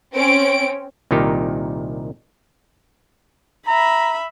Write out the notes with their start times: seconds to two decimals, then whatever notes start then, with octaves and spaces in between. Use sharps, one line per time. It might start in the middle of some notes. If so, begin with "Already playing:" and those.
0.13 C4 C#4 D7
1.11 C2 A#2 D#3 D#4 G4
3.67 E5 A#5 B5